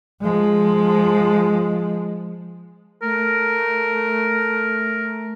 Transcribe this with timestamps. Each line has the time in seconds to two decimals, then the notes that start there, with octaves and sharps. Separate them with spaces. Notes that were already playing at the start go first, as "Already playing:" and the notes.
0.21 F3 G#3
3.02 A3 A#4